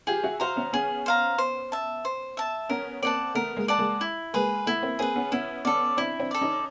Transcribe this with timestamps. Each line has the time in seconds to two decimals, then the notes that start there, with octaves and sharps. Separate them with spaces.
0.07 F4 G4 G#4
0.24 E4 F#4
0.40 E4 F#4 C5 F5 A#5
0.56 B3 C#4
0.73 B3 C#4 G#4
1.06 C5 F5 A#5
1.38 C5
1.72 E5 A5
2.05 C5
2.37 E5 A5
2.69 B3 C#4 A#4
3.02 A#3 C4 D5 F#5 A5
3.35 A3 B3 A#4
3.57 G#3 A#3
3.68 D5 F#5 A5
3.79 G#3 A#3
4.01 E4
4.34 G#3 A#3 G#4 B4
4.66 A3 B3 E4
4.83 A#3 C4
4.99 A#3 C4 G#4 B4
5.16 B3 C#4
5.32 B3 C#4 E4
5.65 B3 C#4 A4 D5
5.97 C4 D4 E4
6.19 C4 D4
6.31 A4 D5
6.41 C#4 D#4